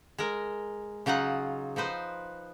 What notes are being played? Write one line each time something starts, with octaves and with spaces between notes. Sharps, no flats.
G#3 A#4
C#3 F#3 D#4 F4 F#5
F3 D#4 B4 C5